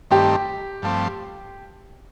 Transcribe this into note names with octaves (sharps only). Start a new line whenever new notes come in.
G2 D#3 A3 C4 G4
G2 F3 A3 C4